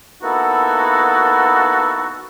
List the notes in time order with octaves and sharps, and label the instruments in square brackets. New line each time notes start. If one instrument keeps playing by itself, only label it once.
[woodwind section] A#3 B3 D#4 E4 F#4 A4